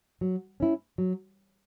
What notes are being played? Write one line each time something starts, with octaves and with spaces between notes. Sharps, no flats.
F#3
C#4 E4
F#3